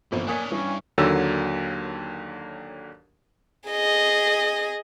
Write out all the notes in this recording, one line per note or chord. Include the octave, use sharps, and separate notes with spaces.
G1 A#2 E3 F3 C4
A#3 D4 C#5 G#5 D#6 B6
G2 E3 C#4
D#2 D3 F#3 A#3 E6
G#4 D#5